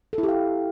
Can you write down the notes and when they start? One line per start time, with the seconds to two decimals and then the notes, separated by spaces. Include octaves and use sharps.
0.13 A4
0.18 E4
0.23 G4
0.28 F5